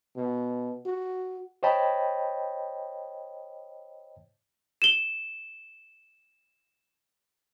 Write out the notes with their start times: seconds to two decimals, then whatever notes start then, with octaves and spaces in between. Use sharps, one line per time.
0.16 B2
0.86 F#4
1.63 C5 C#5 D#5 G5 A5 B5
4.82 E7 G7